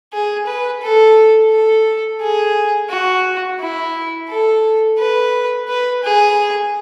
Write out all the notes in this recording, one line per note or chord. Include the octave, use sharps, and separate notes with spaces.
G#4
B4
A4
A4
G#4
F#4
E4
A4
B4
B4
G#4